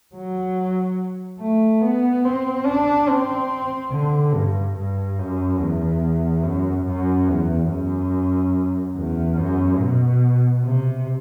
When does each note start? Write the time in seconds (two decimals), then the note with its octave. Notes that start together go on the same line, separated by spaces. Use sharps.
0.15 F#3
1.40 A3
1.82 B3
2.24 C4
2.66 D4
3.09 C4
3.92 D3
4.34 G2
4.77 G2
5.19 F#2
5.59 E2
6.43 F#2
6.86 F#2
7.29 E2
7.69 F#2
8.96 E2
9.37 F#2
9.80 B2
10.63 C3